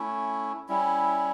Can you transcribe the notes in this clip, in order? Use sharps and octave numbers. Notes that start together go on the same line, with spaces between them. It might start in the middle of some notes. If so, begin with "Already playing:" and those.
Already playing: A3 C#4 E4
G3 C#4 E4